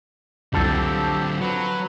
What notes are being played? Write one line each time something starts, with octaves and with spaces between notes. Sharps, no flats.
C2 F2 D3 F3 F#3 C4 G4 A4
F#3 B4